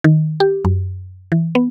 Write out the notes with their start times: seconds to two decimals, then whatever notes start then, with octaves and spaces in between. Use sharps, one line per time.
0.04 D#3
0.40 G4
0.65 F#2
1.32 E3
1.55 B3